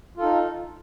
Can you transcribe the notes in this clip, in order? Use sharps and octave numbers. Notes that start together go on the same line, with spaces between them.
D#4 F4 A4